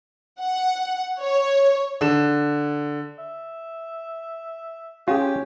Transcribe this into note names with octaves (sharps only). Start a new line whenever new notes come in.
F#5
C#5
D3 E7
E5
C#4 F4 G4 G#4